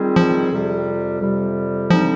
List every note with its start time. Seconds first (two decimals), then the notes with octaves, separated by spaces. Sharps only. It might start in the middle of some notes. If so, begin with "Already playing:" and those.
Already playing: D#3 G3 C4 F4 G#4
0.16 F3
0.51 F2 C3 G3
1.21 F2 C3 G3
1.90 D3 F3 G3 C4 D#4